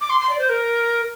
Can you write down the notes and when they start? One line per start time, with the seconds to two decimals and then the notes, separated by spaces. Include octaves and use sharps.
0.01 D6
0.10 C6
0.20 C6
0.30 D5
0.39 C5
0.49 A#4